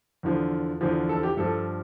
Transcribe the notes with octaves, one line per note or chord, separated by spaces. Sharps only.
E2 D3 F3
E2 D3 F3
A4
G4
G2 F3 A4